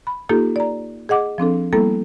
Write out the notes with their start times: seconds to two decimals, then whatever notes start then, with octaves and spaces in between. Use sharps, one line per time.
0.07 B5
0.29 A#3 D#4 F4 G4 A4
0.56 D5 A#5
1.09 G#4 D#5 F#5 D6
1.38 F3 C4 D4 A4
1.73 G3 A#3 B3 E4 A4